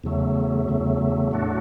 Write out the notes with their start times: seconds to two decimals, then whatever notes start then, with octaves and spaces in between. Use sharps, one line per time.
0.04 E2 C#3 F#3 A3
0.68 E2 C#3 F#3 A3
1.31 A2 F#3 A3 D4 F#4